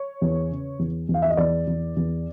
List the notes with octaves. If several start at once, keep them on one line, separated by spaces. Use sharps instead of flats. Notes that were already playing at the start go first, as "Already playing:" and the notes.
Already playing: C#5
E2
C#3
E2
E2
F5
E5
D#5
E2 D5
E2
E2